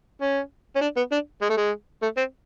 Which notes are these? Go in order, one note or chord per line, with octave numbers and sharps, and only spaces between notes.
C#4
C#4
D4
B3
D4
G#3
A3
G#3
A3
C4